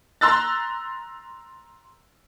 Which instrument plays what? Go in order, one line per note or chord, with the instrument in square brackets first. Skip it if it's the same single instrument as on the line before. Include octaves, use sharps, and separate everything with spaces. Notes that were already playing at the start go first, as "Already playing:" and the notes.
[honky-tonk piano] A#5 C6 E6 F#6 A6